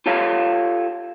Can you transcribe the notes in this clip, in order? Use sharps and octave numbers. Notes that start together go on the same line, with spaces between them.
F4 G4 A4 C#5 F5